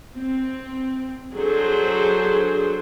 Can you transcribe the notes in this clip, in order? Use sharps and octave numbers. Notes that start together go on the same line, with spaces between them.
C4
F#3 D4 G#4 A4 C5